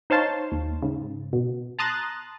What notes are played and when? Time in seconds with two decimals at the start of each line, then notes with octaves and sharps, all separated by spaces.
0.10 D#4 C5 C#5 F5 A5 C6
0.52 D#2
0.82 G#2 C#3
1.33 B2
1.79 A5 A#5 C6 D#6 F#6 A6